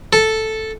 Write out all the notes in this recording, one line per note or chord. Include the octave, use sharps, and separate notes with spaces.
A4